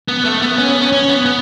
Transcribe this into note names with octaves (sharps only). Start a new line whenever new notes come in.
B3
A3
B3
C#4
B3
C#4
C#4
B3
B3